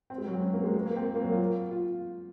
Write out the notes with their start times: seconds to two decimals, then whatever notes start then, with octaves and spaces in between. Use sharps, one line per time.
0.10 C4
0.18 G#3
0.26 F#3
0.34 C4
0.42 C#4
0.54 A#3
0.64 G#3
0.74 G#3
0.86 A#3
0.96 C4
1.15 A#3
1.23 F#3
1.32 F4
1.71 F4